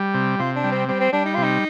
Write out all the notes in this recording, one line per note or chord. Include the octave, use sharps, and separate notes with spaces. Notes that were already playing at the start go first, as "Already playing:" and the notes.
Already playing: G3
C3
C3 F4
D4
G3
C4
G3 C4
C4
G3 D4
D#4
C3 F4
D#4